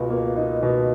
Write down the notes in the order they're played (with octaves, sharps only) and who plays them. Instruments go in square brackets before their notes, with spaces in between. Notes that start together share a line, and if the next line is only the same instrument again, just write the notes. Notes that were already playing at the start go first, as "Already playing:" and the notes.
Already playing: [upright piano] C#2 B2
A#3
D#4
B2